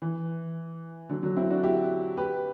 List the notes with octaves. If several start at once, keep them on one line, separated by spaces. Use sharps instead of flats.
E3
D3 F#3
D3 F#3
C4 E4
D4 F#4
E4 G4
G4 B4